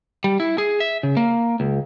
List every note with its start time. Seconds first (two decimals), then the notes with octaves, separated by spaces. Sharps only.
0.24 G3
0.40 E4
0.58 G#4
0.80 E5
1.03 C#3
1.17 A#3
1.60 C#2